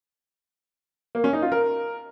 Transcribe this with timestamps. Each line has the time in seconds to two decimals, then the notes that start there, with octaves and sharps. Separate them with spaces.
1.15 A#3
1.24 C#4
1.33 D#4
1.42 F4
1.52 A#4